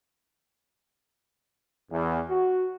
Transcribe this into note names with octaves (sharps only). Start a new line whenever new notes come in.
E2
F#4